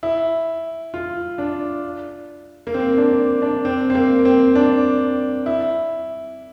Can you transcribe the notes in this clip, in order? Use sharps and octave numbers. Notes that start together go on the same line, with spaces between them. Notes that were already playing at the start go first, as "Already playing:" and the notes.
E4
F4
D4
A#3
C4
D4
D4
C4
C4
A#3
C4
D4
E4